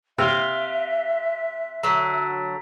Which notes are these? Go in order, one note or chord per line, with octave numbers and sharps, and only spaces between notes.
C3 C4 E5 F5 F#6 F7 G7
D3 F#3 A#5 B6